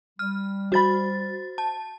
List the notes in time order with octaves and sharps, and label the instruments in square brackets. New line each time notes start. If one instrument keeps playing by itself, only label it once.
[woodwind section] G3 [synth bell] F6
[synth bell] F#4 A6 [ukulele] C5 B5
[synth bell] A5